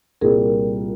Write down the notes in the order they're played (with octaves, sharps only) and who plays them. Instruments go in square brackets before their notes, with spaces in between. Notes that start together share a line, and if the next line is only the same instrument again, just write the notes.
[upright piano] C2 A#2 G3 A#3 [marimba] G#4 A#4